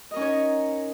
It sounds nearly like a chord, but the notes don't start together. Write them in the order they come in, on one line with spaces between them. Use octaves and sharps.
D#5 A#4 C#4 D#4 C#5